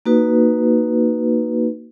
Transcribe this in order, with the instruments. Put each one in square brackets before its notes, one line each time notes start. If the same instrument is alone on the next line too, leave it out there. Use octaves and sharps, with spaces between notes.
[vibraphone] A#3 D#4 F#4 B4